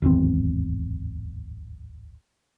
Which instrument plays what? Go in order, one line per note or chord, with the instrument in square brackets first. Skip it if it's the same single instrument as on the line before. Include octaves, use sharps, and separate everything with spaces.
[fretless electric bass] D1 G#1 E2 C4